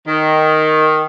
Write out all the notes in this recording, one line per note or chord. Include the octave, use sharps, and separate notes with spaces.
D#3